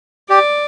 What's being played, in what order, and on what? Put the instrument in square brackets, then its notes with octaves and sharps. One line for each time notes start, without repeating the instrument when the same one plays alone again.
[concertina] G4 [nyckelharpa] D5